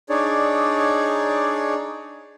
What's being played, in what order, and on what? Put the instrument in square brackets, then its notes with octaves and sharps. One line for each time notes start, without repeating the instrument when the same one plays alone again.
[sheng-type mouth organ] D4 D#4 G#4 C#5 D5